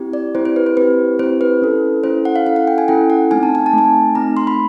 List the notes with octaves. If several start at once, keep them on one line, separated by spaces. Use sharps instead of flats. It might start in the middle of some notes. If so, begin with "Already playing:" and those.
Already playing: C4 E4 G4
D5
C4 E4 G4 C5
C5
B4
C5
C4 E4 G4 B4
C4 E4 G4 C5
B4
C#4 E4 A4
C#4 E4 A4 C5
F#5
F5
C#4 E4 A4 F5
F#5
G5
G#5
C#4 E4 A4 G5
F#5
A3 C4 D#4 G#5
A5
G#5
A5
A3 C4 D#4 G#5
A3 C4 D#4 A#5
C6
B5